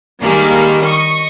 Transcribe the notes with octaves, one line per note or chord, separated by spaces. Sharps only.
D#3 G3 G#3 A#3
D#5 C#6